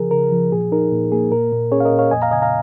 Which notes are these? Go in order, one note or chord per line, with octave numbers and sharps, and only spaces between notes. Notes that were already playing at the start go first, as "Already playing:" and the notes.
Already playing: C#3 F3 G#4 A#4
C#3 A#4
F3
A#2 G#4
D#4 A#4
A#2
A#3 G#4
A#2 A#4
A#2
C#4 G#4 C#5
F5
A#4 D#5
A#2
C#5 F5
F2 D#5 G#5
F5 A#5
C#3 D#5 G#5
F5 A#5